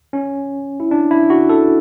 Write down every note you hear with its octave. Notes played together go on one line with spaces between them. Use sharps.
C#4
E4
D4
E4
F#4
A4